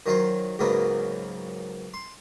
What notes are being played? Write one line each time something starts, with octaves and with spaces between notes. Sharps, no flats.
D#3 F#3 F4 C5
C#2 G#2 C#3 F#3 A#3 B3
C6